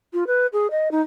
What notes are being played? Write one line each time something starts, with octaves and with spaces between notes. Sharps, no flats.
F4
B4
G#4
D#5
D#4